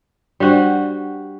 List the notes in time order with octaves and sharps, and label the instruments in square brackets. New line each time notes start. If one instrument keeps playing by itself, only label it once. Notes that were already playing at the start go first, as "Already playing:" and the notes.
[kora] G3 F#4 [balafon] D4 C5 D5